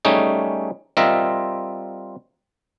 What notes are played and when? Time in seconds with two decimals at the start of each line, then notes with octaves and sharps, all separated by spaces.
0.05 G3 A3 C#4 D#4 G#4
0.97 G3 C4 F4 A#4 D#5 E5